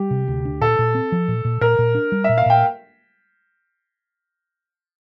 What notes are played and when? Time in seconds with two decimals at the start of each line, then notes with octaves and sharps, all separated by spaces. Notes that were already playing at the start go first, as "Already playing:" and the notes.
Already playing: G3 G4
0.11 C3
0.28 D2
0.45 D4
0.61 A#2 A4
0.79 A#2
0.95 C4
1.12 F3
1.28 A#2
1.45 A#2
1.61 A#2 A#4
1.79 A#2
1.95 D4
2.12 G3
2.24 E5
2.29 A#2
2.38 F5
2.46 A#2 G5